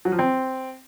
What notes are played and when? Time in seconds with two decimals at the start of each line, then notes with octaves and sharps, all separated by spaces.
0.05 F#3
0.12 F3
0.19 C4